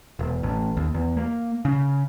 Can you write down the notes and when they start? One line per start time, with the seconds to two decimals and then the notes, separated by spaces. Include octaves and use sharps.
0.19 E1
0.43 A1
0.77 D#2
0.94 E2
1.17 A#3
1.65 C#3